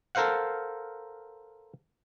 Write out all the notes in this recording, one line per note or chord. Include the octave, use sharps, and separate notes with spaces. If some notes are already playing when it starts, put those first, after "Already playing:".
A4 A#4 C5 F5 F#5